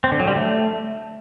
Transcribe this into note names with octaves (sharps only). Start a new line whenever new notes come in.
C4
D3
F#3
G3
A3